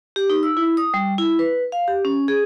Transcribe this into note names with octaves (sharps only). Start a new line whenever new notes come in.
G4
D#4
E6
E4
D#6
G3
E4
B4
F5
G4
C#4
G#4